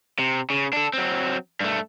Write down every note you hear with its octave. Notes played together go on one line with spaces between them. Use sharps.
C3
C#3
D4 A4
F#3 C4
G2 A3